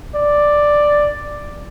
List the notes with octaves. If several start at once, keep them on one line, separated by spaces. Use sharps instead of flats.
D5